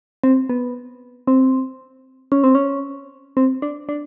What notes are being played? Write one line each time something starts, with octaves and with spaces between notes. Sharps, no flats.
C4
B3
C4
C#4
C4
C#4
C4
D4
D4